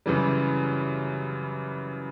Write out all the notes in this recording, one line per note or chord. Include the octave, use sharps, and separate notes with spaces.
F#2 C#3 E3 G3